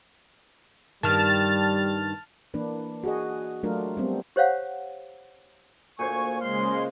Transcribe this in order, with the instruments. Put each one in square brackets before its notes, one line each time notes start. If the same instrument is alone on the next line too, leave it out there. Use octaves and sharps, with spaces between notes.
[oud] G2 D#3 [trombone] G3 [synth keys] A5 F6 A6
[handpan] E3 A#3 D4 B4
F#4 G#4 D#5
F#3 A3 D4 F4 A#4
G3 B3 C4
[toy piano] G4 C5 C#5 F5 F#5
[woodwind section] D2 G#5 C#6 [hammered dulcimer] A#2 C5 C#5
[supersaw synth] C#3 G#3 [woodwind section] F5 C6